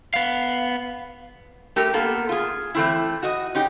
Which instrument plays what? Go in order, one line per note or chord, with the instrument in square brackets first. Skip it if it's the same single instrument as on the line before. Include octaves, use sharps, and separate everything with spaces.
[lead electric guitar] B3 F5
[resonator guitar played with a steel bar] A3 G4 A#4
A#3 B3 A4
F4 G#4
E3 A3 C4 E4
F#4 D#5
C#4 D#4 G4